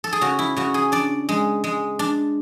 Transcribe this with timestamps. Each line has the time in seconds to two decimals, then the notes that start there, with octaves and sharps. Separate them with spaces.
0.04 A4
0.13 G#4
0.21 C#3 F#4
0.39 E4
0.57 C#3 F#4
0.74 G#4
0.92 D4 D5
1.29 G#3
1.64 G#3
1.99 D4